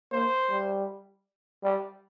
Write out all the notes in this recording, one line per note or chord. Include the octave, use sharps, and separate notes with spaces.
A#3 C5
G3
G3 D5